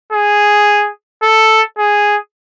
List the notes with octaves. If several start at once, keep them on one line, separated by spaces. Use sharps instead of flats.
G#4
A4
G#4